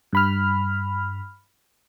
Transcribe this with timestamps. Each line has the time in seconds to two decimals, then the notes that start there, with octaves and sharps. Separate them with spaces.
0.13 G2 B5 F6